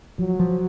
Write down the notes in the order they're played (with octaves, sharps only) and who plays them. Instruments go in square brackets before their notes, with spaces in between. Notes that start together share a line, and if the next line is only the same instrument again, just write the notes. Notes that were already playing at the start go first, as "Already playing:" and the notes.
[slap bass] F3 [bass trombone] F#3
[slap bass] F3